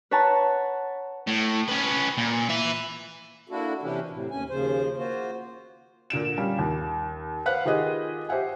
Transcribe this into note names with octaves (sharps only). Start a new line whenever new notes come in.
B4 C#5 F#5 A5 A#5
A2
C#4 B4
A#2
B4 E5
A#3 D4 E4 F#4 A4
C3 E3 C#4 D4 E4 G4
A2 C3
D#2 C#4 G#5
D#2 C#3 F3 C5
A#3 F4 F#4 C5
A#2 D3 D7 E7
G3 C#4 F5
D#2
B4 C5 F5 F#5 F#6
D#3 F4 G4 G#4 B4 D#5
G4 C5 E5 F#5 G#5